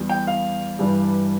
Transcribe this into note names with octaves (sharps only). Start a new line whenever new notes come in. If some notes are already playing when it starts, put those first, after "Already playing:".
Already playing: E2 E3 G3
G5
F5
G2 E3 G3 D4